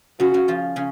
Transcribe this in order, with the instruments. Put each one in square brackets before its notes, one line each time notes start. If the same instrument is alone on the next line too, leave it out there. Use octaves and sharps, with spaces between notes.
[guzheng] C#3 C#4 [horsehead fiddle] F#4
[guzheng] C#3 C#4
F3 F4
C#3 C#4